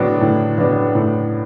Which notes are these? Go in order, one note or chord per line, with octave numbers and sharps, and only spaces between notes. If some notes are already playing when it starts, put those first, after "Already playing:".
Already playing: A2 F#3 B3 D4
A2
F#3 B3 D4
A2